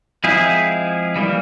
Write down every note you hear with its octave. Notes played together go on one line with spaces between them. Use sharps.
F3 G#3 C4 E4 G#4
E3 G3 A#3